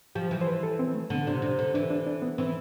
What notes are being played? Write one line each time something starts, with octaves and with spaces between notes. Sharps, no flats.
F3 G4
E3
C5
B4
A4
C4
A3
D3 B3
C3 D4
C3 D4
D3
E3 D4
D4
D4
B3
E3 C4